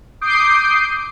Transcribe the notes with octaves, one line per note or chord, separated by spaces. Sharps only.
D6 D#6 G6 C7 D7